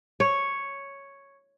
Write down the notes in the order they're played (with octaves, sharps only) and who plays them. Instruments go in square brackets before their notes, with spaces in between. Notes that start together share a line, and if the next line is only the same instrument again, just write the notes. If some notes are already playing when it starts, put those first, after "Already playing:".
[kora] C#5